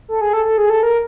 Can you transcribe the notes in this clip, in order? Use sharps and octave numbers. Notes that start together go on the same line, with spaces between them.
A4
G#4
A4
A4
G#4
A4
A#4